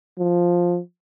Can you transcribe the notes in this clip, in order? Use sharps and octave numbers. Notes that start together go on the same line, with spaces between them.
F3